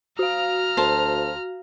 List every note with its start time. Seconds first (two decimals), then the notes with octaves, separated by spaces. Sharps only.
0.19 F#4 F5 A#5 F6
0.77 D2 C5 A5